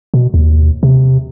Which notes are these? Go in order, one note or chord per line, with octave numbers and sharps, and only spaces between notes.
B2
D#2
C3